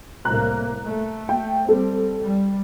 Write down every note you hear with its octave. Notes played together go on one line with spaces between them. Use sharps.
C2 A2 A#3 A#5 F#6
A3
G5
G3 C4 A4
G3